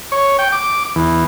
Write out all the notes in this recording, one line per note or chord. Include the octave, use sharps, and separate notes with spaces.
C#5
G5
D6
E2